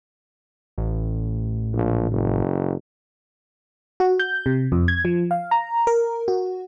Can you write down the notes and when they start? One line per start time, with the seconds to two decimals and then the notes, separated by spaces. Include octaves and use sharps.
0.78 A1
1.74 A#1
2.11 F#1
4.00 F#4
4.20 G6
4.46 C3
4.72 F2
4.88 G#6
5.05 F3
5.31 F5
5.51 A#5
5.87 A#4
6.28 F#4